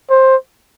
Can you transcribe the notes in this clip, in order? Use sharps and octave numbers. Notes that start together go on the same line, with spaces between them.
C5